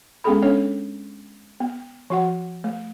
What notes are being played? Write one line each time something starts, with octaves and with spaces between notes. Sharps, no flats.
G#3 B3 C#4 G#4 A4 B5
B3 C#4 D4 A4 C#5
B3
F3 F#4 F#5
A3